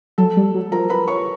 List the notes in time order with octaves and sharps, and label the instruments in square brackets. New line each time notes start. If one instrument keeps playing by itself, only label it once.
[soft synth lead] F#3 [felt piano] A4 A5
[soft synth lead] G3
F#3
[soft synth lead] F3 [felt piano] A#4 A#5
[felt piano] B4 B5
C#5 C#6